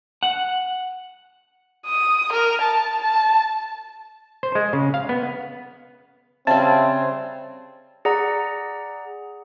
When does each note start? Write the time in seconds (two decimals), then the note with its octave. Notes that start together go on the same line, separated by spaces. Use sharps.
0.23 F#5
1.85 D#6
2.33 A#4
2.61 A5
3.02 A5
4.43 C5
4.55 G#3
4.73 C#3
4.94 F5
5.09 B3
6.47 C#3 G3 C4 E5 A5
8.05 G#4 D5 F#5 A#5